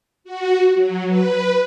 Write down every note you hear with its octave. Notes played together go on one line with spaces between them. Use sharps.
F#4
F#3
B4